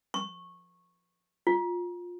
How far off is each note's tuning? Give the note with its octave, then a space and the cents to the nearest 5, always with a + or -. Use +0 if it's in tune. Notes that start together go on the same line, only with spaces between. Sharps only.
C#6 -15
F4 +15